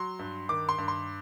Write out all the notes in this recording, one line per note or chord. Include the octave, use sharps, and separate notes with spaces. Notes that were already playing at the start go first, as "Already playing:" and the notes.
Already playing: F#3 C6
G2
D#3 D6
C6
G2
C6